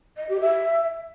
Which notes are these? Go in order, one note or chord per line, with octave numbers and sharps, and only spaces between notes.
D#5
G4
E5